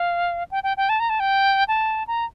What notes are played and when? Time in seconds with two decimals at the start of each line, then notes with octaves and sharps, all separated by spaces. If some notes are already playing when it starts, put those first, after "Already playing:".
Already playing: F5
0.51 G5
0.63 G5
0.77 G5
0.89 A5
1.00 A#5
1.09 A5
1.20 G5
1.68 A5
2.07 A#5